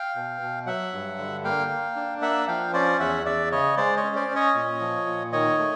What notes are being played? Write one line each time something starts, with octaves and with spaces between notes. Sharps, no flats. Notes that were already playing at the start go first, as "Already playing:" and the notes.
Already playing: F5 G5
B2
B2
F#3 E5 F#5
G2
D3
A#3 F5 G5
A#3
D4
A#3 E5 F#5
F3 F5 G5
C#4 C5 D5
E2 E5 F#5
E2 D5 E5
C#3 C#5 D#5
G#3 C5 D5
C#5 D#5
C#4
C5 D5
C#4
C#5 D#5
A#2
F3
A#2
D#3 C#5 D#5
A3